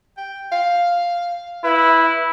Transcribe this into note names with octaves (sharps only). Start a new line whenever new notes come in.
G5
F5
E4 B4